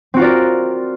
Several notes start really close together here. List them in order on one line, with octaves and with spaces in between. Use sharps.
C4 F#4 F4 D5 A#4